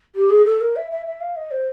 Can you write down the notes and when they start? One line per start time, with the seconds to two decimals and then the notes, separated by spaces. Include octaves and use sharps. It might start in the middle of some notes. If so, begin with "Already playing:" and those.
0.15 G4
0.30 G#4
0.45 A4
0.61 A#4
0.76 E5
0.91 E5
1.06 E5
1.21 F5
1.36 D#5
1.51 C5